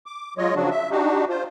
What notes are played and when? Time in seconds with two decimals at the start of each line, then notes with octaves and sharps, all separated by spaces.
0.06 D6
0.38 F#3 G#3 F4 C#5 D#5
0.55 C#3 F3 F#3 D4 F#4
0.71 E5
0.91 D4 D#4 F#4 G4
1.29 F4 C5